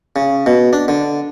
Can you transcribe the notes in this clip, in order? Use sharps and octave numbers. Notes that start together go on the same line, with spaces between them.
C#3
B2
D4
D3